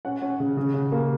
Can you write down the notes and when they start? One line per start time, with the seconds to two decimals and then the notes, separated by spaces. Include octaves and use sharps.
0.05 C#4 F#5
0.22 C#4
0.40 C#3
0.57 C#3
0.74 C#3
0.92 A#3